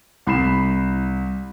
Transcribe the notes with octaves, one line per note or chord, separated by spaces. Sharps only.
C2 B5 C7 E7